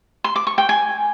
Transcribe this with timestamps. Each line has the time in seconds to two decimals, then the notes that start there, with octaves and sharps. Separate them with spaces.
0.24 C6
0.36 D6
0.47 C#6
0.58 G5
0.69 G#5